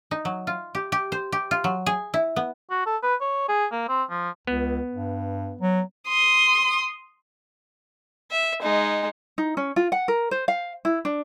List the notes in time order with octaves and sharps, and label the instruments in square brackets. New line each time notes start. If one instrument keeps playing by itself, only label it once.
[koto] D#4
F#3
F4
G4
G4
C5
G4
F4
F#3
G#4
E4
B3
[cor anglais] F#4
A4
B4
C#5
G#4
A#3
C4
F3
[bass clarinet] C#2 [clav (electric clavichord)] B3
[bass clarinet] G2
F#3
[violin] C6 D#6
[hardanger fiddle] E5
G#3 D#4
[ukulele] D#4
C#4
F4
F#5
A#4
C5
F5
E4
D4